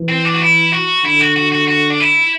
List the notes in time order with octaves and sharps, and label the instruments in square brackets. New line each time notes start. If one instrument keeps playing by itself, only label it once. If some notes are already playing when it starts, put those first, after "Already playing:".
Already playing: [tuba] E3
[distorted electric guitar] C4
D4
F#4
E4
F#4
[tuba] D3 [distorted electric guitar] E4
[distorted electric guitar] F#4
F#4
F#4
F#4
D4
E4